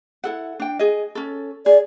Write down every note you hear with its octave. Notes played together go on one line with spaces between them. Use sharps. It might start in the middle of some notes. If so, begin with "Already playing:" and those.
E4 A4 F#5
D4 G5
G#4 D#5
C#4 A4
G#4 D5